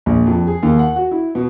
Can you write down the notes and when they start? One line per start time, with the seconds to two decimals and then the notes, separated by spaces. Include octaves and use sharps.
0.06 A#1
0.26 F2
0.47 G#4
0.63 D#2
0.79 F#5
0.96 F#4
1.11 E4
1.35 B2